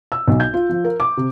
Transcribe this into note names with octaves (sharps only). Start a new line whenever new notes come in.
E6
B1
G6
F4
F3
A#4
D6
C3